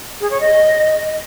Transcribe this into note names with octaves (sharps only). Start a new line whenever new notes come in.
G#4
C#5
D#5